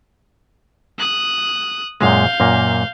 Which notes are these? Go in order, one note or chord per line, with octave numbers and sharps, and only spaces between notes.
D#6 F#6
F#2 A#2 G#3 F5 G6
F#2 A#2 A#3